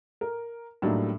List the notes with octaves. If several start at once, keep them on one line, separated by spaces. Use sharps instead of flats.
A#4
A2 F#3 G3 A#3 D4 D#4